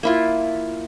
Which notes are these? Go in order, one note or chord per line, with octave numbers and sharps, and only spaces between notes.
A#3 E4 F4